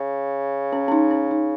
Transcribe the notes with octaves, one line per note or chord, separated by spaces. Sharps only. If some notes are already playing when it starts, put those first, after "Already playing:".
Already playing: C#3
C#4
C#4
D#4
C#4
D#4